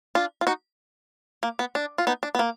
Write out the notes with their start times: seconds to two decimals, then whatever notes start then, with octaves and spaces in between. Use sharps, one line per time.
0.15 D4 F4
0.41 F4
0.47 D#4 F#4
1.43 A#3
1.59 B3
1.75 D4
1.98 F4
2.07 B3 D#4
2.23 D4
2.35 B3
2.39 A#3